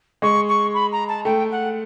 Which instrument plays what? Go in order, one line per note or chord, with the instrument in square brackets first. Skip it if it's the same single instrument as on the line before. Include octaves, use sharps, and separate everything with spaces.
[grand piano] G#3 [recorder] C#6
[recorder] C#6
B5
A#5
A5
[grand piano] A3 [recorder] G5
[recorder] F#5